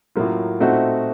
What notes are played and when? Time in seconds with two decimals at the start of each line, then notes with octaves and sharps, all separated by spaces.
0.16 A2 F#3 A#3 F4
0.60 A#2 A3 C4 D#4 F#4